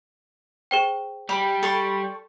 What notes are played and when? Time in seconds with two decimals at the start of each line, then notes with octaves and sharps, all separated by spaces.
0.71 G#4 C5 G5
1.29 G3 B5
1.63 A4 C6 C#6